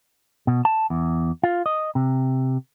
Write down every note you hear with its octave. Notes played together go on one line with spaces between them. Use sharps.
B2
A5
E2
F4
D#5
C3